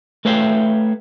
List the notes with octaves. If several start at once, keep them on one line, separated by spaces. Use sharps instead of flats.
A3 B4 C#5 E5 F5 G5